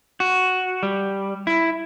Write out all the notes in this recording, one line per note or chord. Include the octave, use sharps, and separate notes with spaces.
F#4
G3
E4